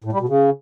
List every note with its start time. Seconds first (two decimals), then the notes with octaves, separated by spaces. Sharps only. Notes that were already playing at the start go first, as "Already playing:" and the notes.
0.04 A2
0.12 G3
0.21 B2
0.29 C#3